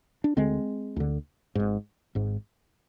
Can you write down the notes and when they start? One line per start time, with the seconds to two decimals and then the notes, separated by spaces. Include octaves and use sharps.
0.24 D4
0.37 D2 D3 G#3 C4
0.96 D2 D3
1.55 G#1 G#2
2.15 G#1 G#2